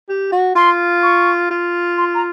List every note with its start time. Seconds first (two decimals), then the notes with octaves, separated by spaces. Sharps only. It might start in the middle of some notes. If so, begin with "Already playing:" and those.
0.09 G4
0.32 F#4
0.55 F4 C6
1.03 C#6
1.50 F4
1.98 C6
2.14 A#5